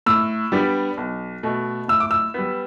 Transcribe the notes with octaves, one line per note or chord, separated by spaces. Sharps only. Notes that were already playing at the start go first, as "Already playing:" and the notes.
A2 E6
G3 B3 D4
B1
B2 A3
A2 E6
D6
E6
G3 B3